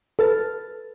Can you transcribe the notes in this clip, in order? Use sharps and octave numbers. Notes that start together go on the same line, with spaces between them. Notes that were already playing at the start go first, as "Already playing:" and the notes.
A4 B4 F6 A6